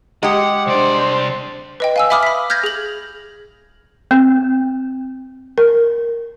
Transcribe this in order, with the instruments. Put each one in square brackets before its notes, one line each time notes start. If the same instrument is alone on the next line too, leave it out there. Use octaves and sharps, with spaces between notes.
[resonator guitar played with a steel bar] G#3 G4 [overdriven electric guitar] F#5
[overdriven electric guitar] C2 D5 [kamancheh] D4 C5
[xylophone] B4 D#5 G5
F5 G#5 E6
E5 G#5 B5 D6 D#6 F6
B5 B6
F6 G6 G#6 A#6
G#4 F#7
[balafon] C4
A#4